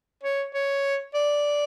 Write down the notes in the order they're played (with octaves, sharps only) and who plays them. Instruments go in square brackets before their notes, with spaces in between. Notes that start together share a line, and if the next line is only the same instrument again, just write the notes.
[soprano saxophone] C#5
C#5
D5